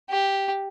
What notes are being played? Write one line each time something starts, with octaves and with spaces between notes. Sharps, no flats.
G4